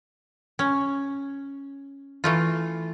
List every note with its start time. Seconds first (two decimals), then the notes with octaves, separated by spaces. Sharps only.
0.59 C#4
2.24 E3 A3 F4